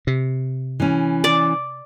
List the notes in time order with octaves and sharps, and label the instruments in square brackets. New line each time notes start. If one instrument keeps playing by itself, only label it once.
[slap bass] C3
[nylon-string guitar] E3 C#4
[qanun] D5